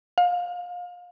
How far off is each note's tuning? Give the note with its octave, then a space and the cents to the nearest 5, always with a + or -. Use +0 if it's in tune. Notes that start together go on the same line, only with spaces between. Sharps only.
F5 +25